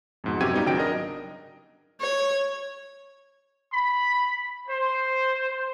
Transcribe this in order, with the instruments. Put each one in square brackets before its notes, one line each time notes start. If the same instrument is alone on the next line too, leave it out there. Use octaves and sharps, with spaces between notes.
[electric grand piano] F2 G#2 B2
F#2 C3 F#4 G4 G#6 D#7
G3 B3 D#4 F4 G4
G#1 C#3 F#3 G5 D7
D4 A#4 D#5
[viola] C#5
[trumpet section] B5
C5